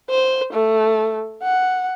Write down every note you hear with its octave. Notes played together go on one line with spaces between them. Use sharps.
C5
A3
F#5